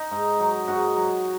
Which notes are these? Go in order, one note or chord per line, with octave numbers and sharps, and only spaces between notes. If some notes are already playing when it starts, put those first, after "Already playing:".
Already playing: D#4
G#2
F#3
G#2 F#4
F#3